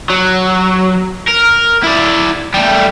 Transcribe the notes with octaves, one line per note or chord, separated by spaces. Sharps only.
F#3
A#4
E4 D5
G3 A3